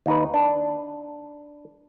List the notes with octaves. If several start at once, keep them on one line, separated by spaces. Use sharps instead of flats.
D#2 D#4 B4
D4